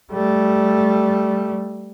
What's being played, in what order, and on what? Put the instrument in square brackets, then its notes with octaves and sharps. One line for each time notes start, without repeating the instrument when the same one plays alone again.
[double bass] G3 A3